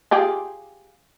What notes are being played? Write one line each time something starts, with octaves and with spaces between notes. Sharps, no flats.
F4 G4 G#4